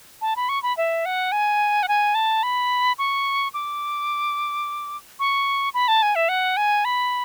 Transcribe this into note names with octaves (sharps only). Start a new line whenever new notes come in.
A5
B5
C#6
B5
E5
F#5
G#5
F#5
G#5
A5
B5
C#6
D6
C#6
B5
A5
G#5
E5
F#5
G#5
B5